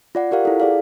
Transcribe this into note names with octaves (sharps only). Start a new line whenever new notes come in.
F4 D5 F#5
F4 G4 A#4 F5 F#5
E4 A4
G#4 D5 F5